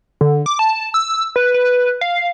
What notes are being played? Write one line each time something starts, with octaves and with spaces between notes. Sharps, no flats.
D3
D6
A5
E6
B4
B4
F5